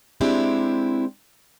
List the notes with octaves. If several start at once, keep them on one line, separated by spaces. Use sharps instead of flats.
G#3 C4 D4 E4 G4